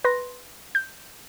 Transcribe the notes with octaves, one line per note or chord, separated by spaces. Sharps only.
B4 C6 A#6
G6